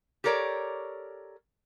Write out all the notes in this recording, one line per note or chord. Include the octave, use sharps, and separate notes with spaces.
G4 A4 A#4 C#5 D5